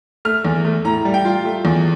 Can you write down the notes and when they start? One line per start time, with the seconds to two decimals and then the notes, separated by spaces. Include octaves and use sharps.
0.25 A3 F6
0.45 E2
0.65 A3
0.84 A2 A#5
1.05 G3
1.14 G5
1.25 F4
1.45 A3
1.65 E2